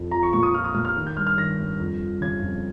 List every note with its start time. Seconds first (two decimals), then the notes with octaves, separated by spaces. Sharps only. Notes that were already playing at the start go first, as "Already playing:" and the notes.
Already playing: F2
0.11 F3 A#5
0.23 C#6
0.33 A#2 C#6
0.43 D#6
0.54 F3 F6
0.64 D#6
0.74 A#2 F6
0.85 F6
0.96 D#3
1.07 G6
1.16 G2 F6
1.27 F6
1.38 D#3 A#6
1.59 G2
1.80 F2
2.00 F3
2.21 C#3 G#6
2.42 F2